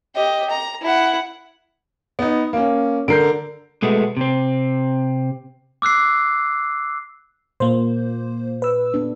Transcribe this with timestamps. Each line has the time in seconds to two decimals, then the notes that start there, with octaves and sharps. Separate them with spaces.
0.15 G4 D#5
0.50 A#5
0.82 E4 F#5
2.19 B3 D#4
2.53 A#3 C#4
3.08 D3 A#4 G6 C7 D7
3.83 B2 G#3 A3 B3
4.17 C3 C4
5.82 D6 E6 F#6 C7
7.60 A#2 A#3 C5
8.62 B4 E6
8.94 B3 D4